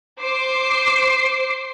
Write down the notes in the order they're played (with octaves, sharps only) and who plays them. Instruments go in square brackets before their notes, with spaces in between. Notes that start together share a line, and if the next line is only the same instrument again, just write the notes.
[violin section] C5 D6 C7